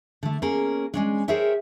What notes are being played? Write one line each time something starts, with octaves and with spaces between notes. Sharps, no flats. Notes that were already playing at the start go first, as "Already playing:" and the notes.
D3 A3
A#3 C#4 G#4 A#4
G#3 C#4 D4
G#4 A#4 C5 C#5 E5 G5